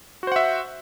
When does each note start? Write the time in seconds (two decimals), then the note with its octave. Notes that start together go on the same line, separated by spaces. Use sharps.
0.23 F#4
0.27 C5
0.32 F#5
0.36 E5